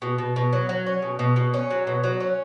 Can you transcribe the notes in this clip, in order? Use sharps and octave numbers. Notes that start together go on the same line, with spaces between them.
B2
B2
B2
F#3
F#3
C#4
B2
B2
B2
C#4
F#3
B2
F#3
C#4